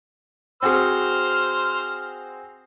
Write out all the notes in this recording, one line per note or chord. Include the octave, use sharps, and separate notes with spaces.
C4 F#4 G#4 C5 F6